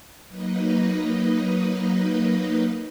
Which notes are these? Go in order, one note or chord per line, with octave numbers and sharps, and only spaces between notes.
F#3 A#3 D#4 B4 D#5